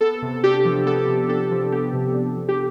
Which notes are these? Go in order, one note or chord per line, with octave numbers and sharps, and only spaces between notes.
B3 A4
C3
D4 G4
F3
B3 A4
C3
D4 A4
F3
B3 G4
C3
D4
F3
G4